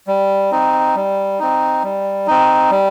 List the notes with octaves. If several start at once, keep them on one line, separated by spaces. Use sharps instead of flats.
G3
C4 D#4
G3
C4 D#4
G3
C4 D#4
G3